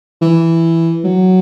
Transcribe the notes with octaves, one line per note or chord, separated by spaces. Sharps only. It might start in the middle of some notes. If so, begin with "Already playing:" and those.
E3
F#3